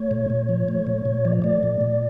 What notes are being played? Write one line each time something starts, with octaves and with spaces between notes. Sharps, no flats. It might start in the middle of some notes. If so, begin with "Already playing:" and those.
Already playing: A3 C#5
A#2
A#2
F3
A3
A#2
A#2
F3 D5
A3 D5
A#2
A#2